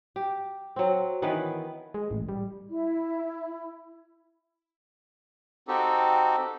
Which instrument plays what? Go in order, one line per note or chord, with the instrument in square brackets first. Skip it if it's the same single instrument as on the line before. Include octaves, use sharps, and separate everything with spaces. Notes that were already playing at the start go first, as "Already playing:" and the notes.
[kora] G4
F#3 C4
D#3 E3 B3 B4
[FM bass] G#3
A1
G3
[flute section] E4
[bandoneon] C4 D#4 F#4 G4 A4